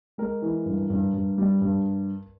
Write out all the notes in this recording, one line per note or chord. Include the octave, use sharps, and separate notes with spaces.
G#3 A#4
E3
G2
G2
G2
G3
G2